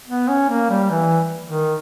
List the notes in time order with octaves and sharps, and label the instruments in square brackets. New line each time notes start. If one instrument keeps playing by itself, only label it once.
[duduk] B3
C#4
A#3
G3
E3
D#3